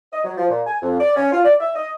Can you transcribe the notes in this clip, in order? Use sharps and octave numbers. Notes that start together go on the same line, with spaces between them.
D#5
F#3
F3
A#2
G#5
F2
D5
C#4
F4
D5
E5
D#5